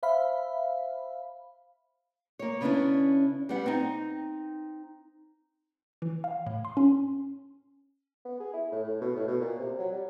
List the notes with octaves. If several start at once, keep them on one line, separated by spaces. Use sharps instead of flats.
C5 E5 F5 B5
A#3 C#5
C#3 B3 C#4 D4 E4
G3 B3 F#5
C4 D#4
E3
F5
A2
C6
C#4
B3
G#4
E4
A2
A2
B2
A2
B2
A#2
C3
F#3
G3